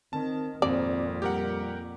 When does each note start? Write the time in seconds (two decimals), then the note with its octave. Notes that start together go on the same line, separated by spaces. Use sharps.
0.13 D#3 C4 A5
0.62 G#1 F2 A#2 C4 D5
1.22 G3 G4 A#4 F#5